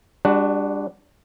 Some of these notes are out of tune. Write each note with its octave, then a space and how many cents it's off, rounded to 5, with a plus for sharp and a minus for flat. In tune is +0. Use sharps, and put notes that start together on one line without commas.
G3 +40 D4 +0 F#4 +10